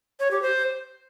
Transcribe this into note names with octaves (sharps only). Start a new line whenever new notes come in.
C#5
G4
C5